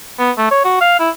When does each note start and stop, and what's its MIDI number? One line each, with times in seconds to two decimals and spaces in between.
0.19 0.31 59
0.37 0.47 57
0.51 0.61 73
0.64 0.76 66
0.81 0.95 77
0.99 1.09 64